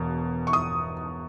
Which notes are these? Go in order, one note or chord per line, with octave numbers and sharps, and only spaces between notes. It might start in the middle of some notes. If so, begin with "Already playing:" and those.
Already playing: E1 B2
C#6
D#6